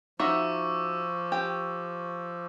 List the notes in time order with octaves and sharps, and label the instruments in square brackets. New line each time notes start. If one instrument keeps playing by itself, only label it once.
[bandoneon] F3 [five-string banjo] D#4 F#4 E5 [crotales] C#6 D6 E6
[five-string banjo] G4